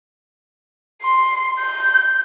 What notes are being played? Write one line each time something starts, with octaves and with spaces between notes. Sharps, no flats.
C6
G6